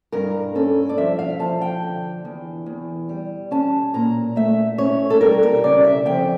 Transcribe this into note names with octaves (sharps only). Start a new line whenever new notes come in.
G2 A#4
C#4 A4
D5
F3 E5
F5
F3 A5
G5
D3
E2
E2
G3
C#4 A5
A#2 A#5
A3 E5
C#4 C#5
A4
G3 A#4
A#4
C#3 D5
E5
F2 G5